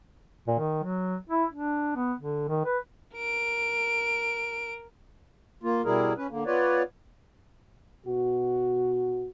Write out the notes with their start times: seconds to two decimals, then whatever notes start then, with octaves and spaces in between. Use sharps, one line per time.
0.48 A#2
0.59 D#3
0.83 F#3
1.30 E4
1.53 D4
1.96 B3
2.19 D3
2.49 D#3
2.65 B4
3.15 A#4 D7
5.63 A#3 F4
5.85 B2 G3 E4 G#4 A#4
6.18 C#4 B4
6.30 D3 A#3
6.46 B3 F4 B4 C#5 D5
8.07 B2 F#4